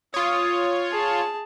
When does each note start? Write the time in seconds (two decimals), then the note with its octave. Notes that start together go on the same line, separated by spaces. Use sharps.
0.14 F4 C#5 D#6
0.90 G#4 A5